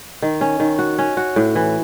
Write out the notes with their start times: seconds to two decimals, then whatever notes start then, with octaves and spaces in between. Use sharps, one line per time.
0.22 D#3
0.41 C#4
0.60 D#3
0.79 F#4
0.98 C#4
1.17 F#4
1.36 A2
1.55 E3